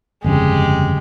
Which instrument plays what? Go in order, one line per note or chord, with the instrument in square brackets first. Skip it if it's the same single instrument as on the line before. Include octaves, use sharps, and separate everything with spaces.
[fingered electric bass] G1 F2 C#3 [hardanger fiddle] G#3 G4